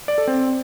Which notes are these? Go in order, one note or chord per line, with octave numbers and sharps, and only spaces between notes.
D5
A4
C4